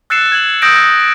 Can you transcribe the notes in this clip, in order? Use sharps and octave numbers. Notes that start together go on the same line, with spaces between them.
E6 F#6 A6 C7 C#7 E7
G#6 F#7
D#6 E6 G6 A#6 D7